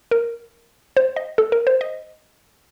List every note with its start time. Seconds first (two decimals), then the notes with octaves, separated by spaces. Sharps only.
0.11 A#4
0.97 C5
1.16 D#5
1.38 A4
1.52 A#4
1.67 C5
1.81 D#5